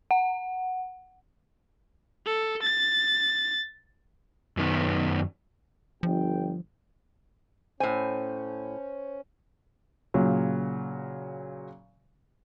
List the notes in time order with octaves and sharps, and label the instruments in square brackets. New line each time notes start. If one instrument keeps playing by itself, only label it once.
[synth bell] F#5
[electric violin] A4
A6
[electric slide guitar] F#2 D#3 B3
[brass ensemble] G1 G5 [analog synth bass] F3
[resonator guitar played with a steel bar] A2 G#5 [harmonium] C#4 [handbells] C5
[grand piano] A#2 C#3 F#3